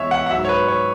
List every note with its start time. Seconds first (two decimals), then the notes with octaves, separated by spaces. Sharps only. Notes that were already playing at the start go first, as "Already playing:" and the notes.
Already playing: E2 E3 G#3 C#5 E5
0.11 F#5
0.26 F#5
0.30 F#3 E5
0.34 G#2
0.45 C#5
0.49 B4
0.68 C#5